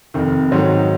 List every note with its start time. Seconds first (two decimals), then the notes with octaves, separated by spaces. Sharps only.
0.14 F1 F2 D#3
0.52 G#2 D#3 F#3